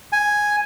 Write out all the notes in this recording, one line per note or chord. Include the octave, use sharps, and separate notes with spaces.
G#5